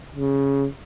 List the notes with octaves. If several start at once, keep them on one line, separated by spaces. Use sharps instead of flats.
C#3